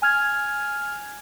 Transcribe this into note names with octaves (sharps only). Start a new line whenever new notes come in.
G#5 F6 G#6